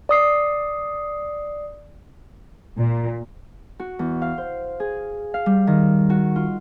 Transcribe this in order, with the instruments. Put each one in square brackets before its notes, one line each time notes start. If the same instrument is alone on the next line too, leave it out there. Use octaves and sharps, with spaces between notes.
[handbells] D5 D#6 C7
[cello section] A#2
[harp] F#4
E2
F5
C5
G#4
F5
G3
D#3
F#4
F4